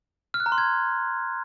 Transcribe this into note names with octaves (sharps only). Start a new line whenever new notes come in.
F6
F#6
A#5
C6
G#6